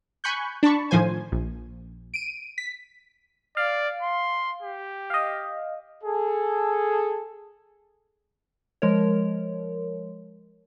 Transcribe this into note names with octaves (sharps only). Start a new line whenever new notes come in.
G#5 B5 C#6 F#6 G6
D4 A5 B5 C#6
A2 D#3 F3 C5 G#5
A#1
D7 D#7
B6
D5 F5
C6
G4
D#5 F5
G#4 A4
F3 G#3 A#4 C#5